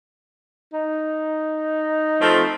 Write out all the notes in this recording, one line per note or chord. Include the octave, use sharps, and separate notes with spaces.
D#4
F3 A3 C4